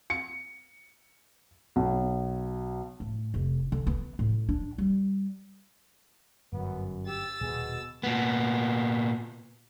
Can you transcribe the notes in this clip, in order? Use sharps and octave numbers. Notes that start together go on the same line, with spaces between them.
C#7
B1
A2
F1
D3
B3
A2
D4
G3
G1 F#2 B3
G4 E6 A6
D#1 B2 G#4
A#2 B3